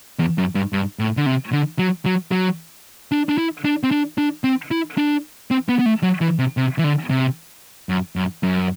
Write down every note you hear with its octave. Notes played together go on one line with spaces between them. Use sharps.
E2
F#2
G2
G2
A2
D3
C3
D3
F#3
F#3
F#3
D4
D4
E4
D4
C4
D4
D4
C4
E4
D4
C4
B3
B3
A3
F#3
E3
C3
C3
E3
D3
C3
F#2
F#2
F#2